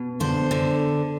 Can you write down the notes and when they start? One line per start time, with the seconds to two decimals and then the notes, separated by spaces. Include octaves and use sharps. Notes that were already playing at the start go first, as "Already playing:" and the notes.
Already playing: B2
0.20 D3 C5
0.51 D3